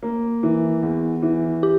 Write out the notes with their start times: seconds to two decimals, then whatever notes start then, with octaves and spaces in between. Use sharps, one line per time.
0.03 A#3
0.43 E3
0.82 E2
1.22 E3
1.63 G4